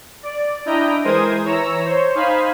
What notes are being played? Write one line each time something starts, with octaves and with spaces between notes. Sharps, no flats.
D5
D4 E4 D#5 G5 A#5
E3 G#3 A#4 C5 D#6 G#6
E3 C#5 A#5 E6
C5 C#5
D#4 C5 F5 G#5 B5